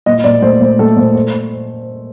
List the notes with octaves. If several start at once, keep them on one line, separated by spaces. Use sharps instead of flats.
A#2 D#5
A#2 D5
A3 C5
A#2 C5
A3 A4
A#2 C5
C5